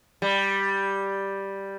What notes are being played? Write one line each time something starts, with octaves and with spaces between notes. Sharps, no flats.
G3